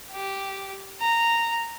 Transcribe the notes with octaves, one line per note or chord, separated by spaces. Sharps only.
G4
A#5